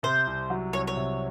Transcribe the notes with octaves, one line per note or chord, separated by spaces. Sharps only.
C3 C5
C2
F#3
C2 C#5
C#5
C3